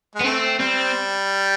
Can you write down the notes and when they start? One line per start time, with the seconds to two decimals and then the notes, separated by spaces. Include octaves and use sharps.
0.15 G#3
0.20 B3
0.24 A3 C4
0.59 G3 C4